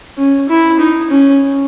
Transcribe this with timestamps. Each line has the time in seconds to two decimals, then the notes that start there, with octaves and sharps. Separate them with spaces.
0.18 C#4
0.49 E4
0.80 D#4
1.11 C#4